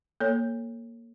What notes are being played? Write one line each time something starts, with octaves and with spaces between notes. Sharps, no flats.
A#3 A4 C#5